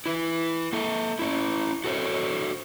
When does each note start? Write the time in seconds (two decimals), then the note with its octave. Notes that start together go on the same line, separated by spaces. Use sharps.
0.06 E4 B4
0.73 A#3 A4
1.19 C#4 E4
1.84 F#4 A4 C5 C#5